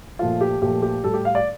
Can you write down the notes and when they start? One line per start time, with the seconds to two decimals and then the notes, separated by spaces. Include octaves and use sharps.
0.19 A#2 F3 A3 F4
0.41 G4
0.62 A#2 F3 A3 G4
0.82 G4
1.04 A2 G3 A4
1.14 G4
1.25 F5
1.35 D5